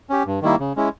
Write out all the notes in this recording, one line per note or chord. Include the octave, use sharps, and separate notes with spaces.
C#4 G4
G2
D#3 G3 A#3 E4
C#3
G#3 C#4 E4